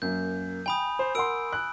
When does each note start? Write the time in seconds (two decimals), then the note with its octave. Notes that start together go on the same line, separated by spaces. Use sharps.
0.02 F#2 A#3 G6
0.66 G5 G#5 B5 D#6
0.99 C5
1.15 A#4 F#5 C6 E6 D7
1.53 F#6